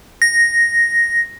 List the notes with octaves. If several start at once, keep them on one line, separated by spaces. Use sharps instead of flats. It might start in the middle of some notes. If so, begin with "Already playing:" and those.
A#6